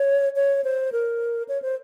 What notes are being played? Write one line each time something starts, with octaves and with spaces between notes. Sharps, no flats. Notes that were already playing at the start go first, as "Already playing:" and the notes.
Already playing: C#5
C#5
C5
A#4
C#5
C5